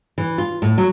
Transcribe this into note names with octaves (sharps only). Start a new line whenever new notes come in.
E3
F4
A2
F#3